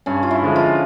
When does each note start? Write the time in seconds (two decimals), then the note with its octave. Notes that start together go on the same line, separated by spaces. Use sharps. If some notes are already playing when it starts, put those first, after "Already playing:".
0.06 G2 C#4
0.23 F4
0.31 E4
0.43 D3 F3 G#3
0.56 F4